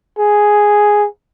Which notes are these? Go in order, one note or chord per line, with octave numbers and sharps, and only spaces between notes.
G#4